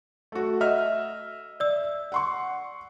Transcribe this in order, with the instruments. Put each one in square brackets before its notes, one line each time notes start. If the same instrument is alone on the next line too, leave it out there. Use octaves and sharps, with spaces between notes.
[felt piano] A3 F#4
D#5 E5 F6
[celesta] D5 E6
[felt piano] F#5 C6 C#6